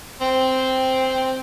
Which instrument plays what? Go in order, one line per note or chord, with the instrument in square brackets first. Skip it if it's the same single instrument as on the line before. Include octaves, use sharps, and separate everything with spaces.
[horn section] C4